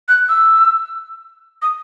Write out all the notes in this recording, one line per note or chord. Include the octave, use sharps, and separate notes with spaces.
F#6
E6
D#6